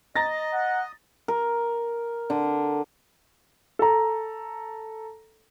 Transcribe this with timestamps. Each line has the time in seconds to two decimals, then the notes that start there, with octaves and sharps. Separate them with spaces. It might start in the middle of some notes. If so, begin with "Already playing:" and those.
0.16 D#5 A#5 A6 A#6
0.53 F#5
1.28 A#4
2.30 D3
3.79 A4 A#5